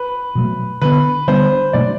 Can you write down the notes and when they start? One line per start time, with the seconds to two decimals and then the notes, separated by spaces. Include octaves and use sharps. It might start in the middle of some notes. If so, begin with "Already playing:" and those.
Already playing: B4
0.35 B2 F#3 A3
0.82 D3 G3 B3 D4 B4
1.27 D3 G3 B3 D4 C5
1.73 B2 F#3 A3 D4 D5